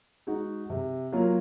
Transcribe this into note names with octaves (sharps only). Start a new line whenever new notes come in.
G#3 D#4 F#4
C3
F#3 A#3 F4